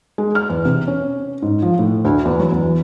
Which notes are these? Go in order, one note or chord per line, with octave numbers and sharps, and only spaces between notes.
G#3
F6
E2
C3
C#4
G#2
F3
A2
D2
E2
F#3
E2